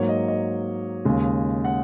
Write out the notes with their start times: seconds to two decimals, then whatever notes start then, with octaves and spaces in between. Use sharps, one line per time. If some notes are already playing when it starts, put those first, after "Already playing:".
Already playing: G#2 F#3 A#3 C#5
0.09 D#5
0.28 D#5
1.05 D#2 C#3 G#3
1.65 F#5